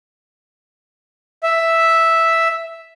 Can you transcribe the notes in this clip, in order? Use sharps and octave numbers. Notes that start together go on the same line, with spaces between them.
E5